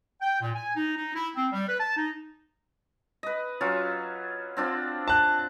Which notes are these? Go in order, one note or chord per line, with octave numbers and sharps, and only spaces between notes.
G5
A#2
G#5
D#4
D#4
E4
C4
G3
B4
A5
D#4
B4 D#5
F#3 C#4 F4
C4 D4 F4
A5 F#6